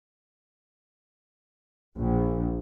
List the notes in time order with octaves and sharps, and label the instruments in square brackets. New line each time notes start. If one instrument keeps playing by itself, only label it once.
[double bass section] A#1